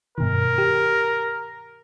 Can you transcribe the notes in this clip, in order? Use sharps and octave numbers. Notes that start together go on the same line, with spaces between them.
G2 B2 D#3 A#4
G4